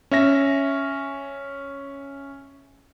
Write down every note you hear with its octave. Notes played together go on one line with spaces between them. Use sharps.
C#4 E5 A#6